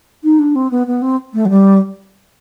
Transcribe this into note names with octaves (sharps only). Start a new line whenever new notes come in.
D#4
D4
C4
B3
B3
C4
A3
F#3
G3